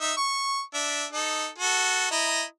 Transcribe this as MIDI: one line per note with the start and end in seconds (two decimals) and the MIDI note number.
0.01 0.13 63
0.01 0.13 76
0.17 0.61 85
0.74 1.05 62
0.74 1.05 76
1.13 1.47 63
1.13 1.47 69
1.59 2.08 66
1.59 2.08 69
2.12 2.43 64
2.12 2.43 75
2.12 2.43 82